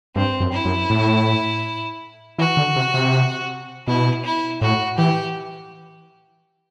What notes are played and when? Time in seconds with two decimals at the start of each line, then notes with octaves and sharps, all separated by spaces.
0.15 G2 C4
0.40 F#2
0.52 E4
0.65 F#2
0.90 A2
2.38 E3 F#4
2.57 D3
2.76 C3
2.94 C3
3.86 B2 E4
4.24 E4
4.61 A2 F#4
4.98 E3 G4